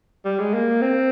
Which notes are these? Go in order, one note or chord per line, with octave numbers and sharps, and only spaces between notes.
G3
G#3
A#3
C4